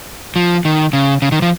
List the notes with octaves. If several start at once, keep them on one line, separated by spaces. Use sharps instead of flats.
F3
D#3
C#3
C#3
D#3
F3